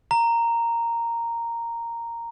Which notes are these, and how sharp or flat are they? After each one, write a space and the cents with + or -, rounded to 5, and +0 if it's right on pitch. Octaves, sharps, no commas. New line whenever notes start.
A#5 -5